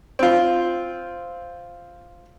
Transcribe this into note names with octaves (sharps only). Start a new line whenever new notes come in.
C4 F4